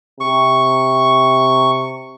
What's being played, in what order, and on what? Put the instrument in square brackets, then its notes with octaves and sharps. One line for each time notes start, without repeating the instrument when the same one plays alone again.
[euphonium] C3 [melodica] C#6